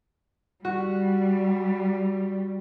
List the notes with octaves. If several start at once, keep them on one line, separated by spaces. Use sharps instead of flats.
G3 F#4